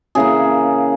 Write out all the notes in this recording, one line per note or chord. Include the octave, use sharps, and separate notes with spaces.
C#3 E3 A#3 G#4